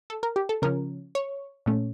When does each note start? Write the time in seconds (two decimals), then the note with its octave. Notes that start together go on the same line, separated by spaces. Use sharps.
0.10 A4
0.23 A#4
0.36 G4
0.49 A4
0.62 C#3 F3 C#4 A#4
1.15 C#5
1.66 A#2 A3 C#4